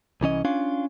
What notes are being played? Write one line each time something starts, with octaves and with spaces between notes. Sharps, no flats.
C2 E3 C#4 D#5
C#4 D4 F4 F5